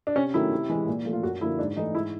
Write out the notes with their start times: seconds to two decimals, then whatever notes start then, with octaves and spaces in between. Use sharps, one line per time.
0.07 D4
0.16 C3 C#4
0.34 D#3 F#3 A3 E4
0.52 C3
0.70 E3 G#3
0.87 A#2
1.05 F3 A3
1.13 F4
1.23 F#2 F#4
1.41 D3 F3 A#3 E4
1.59 G#2 D4
1.77 E3 A3 D#4
1.94 G#2 E4